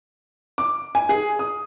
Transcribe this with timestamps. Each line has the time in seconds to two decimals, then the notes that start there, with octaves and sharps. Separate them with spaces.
0.58 D6
0.95 G#5
1.09 G#4
1.39 D#6